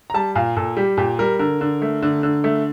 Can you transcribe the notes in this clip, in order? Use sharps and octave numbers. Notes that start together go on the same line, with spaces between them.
A#5
G3 A5
A#2 F5
A#2 A4
G3 G4
A#2 G4
G3 A#4
D3 A#4
D3
A3
D3
D3
A3